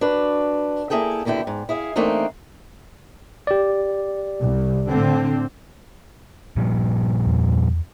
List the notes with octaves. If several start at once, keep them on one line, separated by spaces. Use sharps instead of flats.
D4 F#4 B4
A#3 B3 E4 G#4 A4 G5
D#2 B2 D3 E4 G5
G#2
E4 G#4 F5
E3 A3 A#3 C4 D4 D#4
G4 D5
C2
A2 D3 C4
A#2 F3 G3
E2